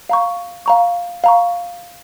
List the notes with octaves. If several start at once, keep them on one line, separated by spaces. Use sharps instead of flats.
F5 A#5 C#6
F5 A#5 C#6
F5 A#5 C#6